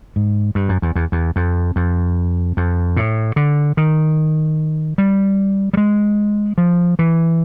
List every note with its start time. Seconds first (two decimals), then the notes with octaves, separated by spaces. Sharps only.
0.16 G#2
0.55 G2
0.69 F#2
0.82 E2
0.96 E2
1.12 E2
1.36 F2
1.76 F2
2.57 F2
2.97 A2
3.36 D3
3.77 D#3
4.98 G3
5.73 G3
5.77 G#3
6.58 F3
6.99 E3